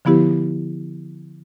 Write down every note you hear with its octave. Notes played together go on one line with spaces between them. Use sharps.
D3 F3 B3 E4 G4 B4